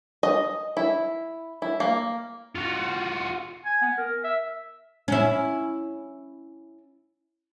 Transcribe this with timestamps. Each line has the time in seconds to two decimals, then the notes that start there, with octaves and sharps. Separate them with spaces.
0.23 D#5
0.77 E4
1.62 E4
1.80 A#3
2.56 F4 F#4
3.65 G#5
3.81 B3
3.98 A#4
4.24 E5
5.08 C#4 E4